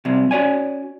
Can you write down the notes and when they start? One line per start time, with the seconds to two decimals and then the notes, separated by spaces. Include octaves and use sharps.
0.05 C3 F#3 G3 C4
0.31 C#4 F#4 C#5 D5 G#5